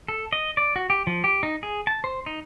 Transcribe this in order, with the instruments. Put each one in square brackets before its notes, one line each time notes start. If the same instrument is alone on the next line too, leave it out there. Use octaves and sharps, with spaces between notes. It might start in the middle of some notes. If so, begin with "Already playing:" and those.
[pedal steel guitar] A4
D#5
D5
F#4
G4
F3
G4
D#4
G#4
A5
C5
D#4